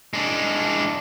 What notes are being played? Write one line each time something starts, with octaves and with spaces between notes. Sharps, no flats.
G#3 D4